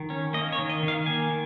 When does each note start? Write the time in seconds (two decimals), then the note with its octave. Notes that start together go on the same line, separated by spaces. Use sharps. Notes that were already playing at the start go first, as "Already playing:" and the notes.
Already playing: D#3
0.10 C#4
0.33 A#3 D#5
0.52 C#5
0.59 D#3
0.70 D#5
0.83 D#3
0.88 F5
1.06 A#3 G#5
1.31 D#3